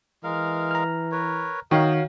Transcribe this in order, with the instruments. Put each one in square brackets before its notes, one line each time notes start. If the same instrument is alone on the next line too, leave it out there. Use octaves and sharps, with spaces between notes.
[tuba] E3 [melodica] G#3 A#4 F5
[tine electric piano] A#5 F6
[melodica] A#4 B4 C#5
[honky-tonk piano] D#3 [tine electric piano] F#4 C#5 F5 [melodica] A#4 D#5 G5